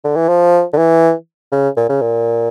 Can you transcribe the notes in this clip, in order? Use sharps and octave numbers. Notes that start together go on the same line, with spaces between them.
D3
E3
F3
D3
E3
C#3
A#2
C#3
A#2